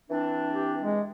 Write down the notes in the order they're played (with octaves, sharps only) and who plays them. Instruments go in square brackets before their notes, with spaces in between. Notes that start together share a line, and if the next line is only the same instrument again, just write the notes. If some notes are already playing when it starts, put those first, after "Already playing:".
[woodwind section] E3 C4 D4
[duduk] G4
G#3